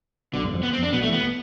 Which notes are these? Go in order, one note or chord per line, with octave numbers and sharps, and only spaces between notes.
B1 B2 D3
G1 G2
F2
B3
C4
F2 D4
B1 B2 B3
A3
A1 A2 B3